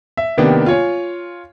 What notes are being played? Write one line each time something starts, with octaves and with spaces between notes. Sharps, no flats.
E5
C3 D#3 A#3 B3 D4 G4
F4 C#5 G#5